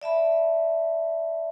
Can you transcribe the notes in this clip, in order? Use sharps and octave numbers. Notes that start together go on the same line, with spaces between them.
D5 E5 A5 B5